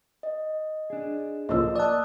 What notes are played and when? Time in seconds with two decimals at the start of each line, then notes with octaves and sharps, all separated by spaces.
0.23 D#5
0.90 D4 G#4
1.49 C#2 A2 F3 A#3 D#5 E6
1.76 D5 A5 D#6 F#6